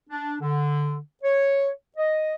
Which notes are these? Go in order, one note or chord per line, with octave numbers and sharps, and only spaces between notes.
D4
D3
C#5
D#5